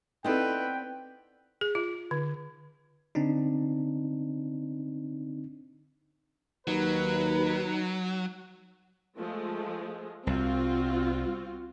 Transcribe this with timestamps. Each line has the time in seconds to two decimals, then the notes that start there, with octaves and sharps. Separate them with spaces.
0.24 B3 C4 D#4 E4 A4 B4 D5 G5
1.61 G#4
1.75 F4
2.11 D3
3.15 D3 C4 D4 D#4
6.67 D#2 F#3 D#4 B4
9.18 F3 G#3 A3
10.27 C2 C4 F4 F#4